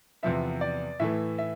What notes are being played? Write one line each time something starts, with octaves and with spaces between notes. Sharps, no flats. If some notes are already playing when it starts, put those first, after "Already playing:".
E2 C3 F3 B3 E5
D5
A2 E3 A3 E5
E5